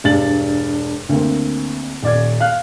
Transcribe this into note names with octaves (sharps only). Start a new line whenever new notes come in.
E1 G2 A6 F#7
D2 A#3 C4
D#1 D5 G#6
F5 F#6